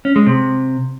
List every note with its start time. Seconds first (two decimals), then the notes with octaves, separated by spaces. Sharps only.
0.05 C#4
0.16 G#3
0.27 C3